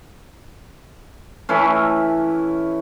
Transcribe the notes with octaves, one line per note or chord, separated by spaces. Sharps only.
E3 A3 C#4